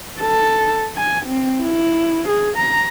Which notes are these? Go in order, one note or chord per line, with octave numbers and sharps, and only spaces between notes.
A4
G#5
C4
E4
G#4
A#5